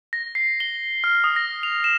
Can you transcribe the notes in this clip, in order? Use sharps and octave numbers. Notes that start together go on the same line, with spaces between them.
A#6
C7
G7
F6
D#6
A#6
F7
E7